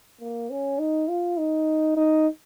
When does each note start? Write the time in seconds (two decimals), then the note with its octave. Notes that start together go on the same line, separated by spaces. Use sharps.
0.21 A#3
0.50 C#4
0.79 D#4
1.08 F4
1.38 D#4
1.96 D#4